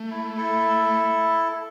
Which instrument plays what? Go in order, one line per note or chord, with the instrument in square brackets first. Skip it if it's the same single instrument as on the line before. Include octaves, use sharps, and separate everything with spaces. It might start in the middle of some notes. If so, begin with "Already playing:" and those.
Already playing: [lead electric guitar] A3
[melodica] E4
E4 A4